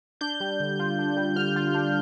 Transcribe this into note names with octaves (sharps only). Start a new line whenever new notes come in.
D4 G6
G3
D3
F4
D4
G3
D3 F6
F4
D4